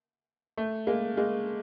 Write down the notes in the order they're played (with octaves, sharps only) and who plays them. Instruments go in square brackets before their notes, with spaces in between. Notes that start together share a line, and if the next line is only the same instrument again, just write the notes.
[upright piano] A3
G#3 A#3
G#3 A#3